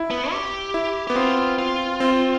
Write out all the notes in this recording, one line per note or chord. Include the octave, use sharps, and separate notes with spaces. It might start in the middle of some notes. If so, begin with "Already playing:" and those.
Already playing: E4
B3
G4
E4
B3 G4
C4 F4
F4
C4